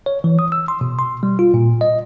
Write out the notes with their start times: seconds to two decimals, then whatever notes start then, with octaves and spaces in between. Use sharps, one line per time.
0.06 C#5
0.24 E3
0.39 D#6
0.52 E6
0.68 C6
0.81 B2
0.99 C6
1.23 G3
1.39 F4
1.54 A#2
1.81 D#5